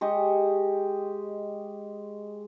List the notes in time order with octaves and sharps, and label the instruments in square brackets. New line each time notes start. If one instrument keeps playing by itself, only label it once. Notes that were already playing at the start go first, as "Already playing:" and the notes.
[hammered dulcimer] G#3 G4 D#5 C#6